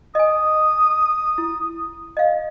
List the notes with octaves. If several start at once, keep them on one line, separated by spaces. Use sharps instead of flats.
D#5 G#5 D#6
E4
D#5 F5